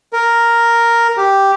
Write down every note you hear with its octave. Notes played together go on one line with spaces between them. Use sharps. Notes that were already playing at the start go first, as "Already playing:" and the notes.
A#4
G4